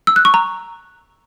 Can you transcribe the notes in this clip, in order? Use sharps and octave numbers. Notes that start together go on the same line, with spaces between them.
E6
F#6
C#6
A#5